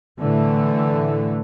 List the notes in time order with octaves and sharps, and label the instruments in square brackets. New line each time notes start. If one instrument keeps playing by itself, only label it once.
[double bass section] A2 D3 E3 A3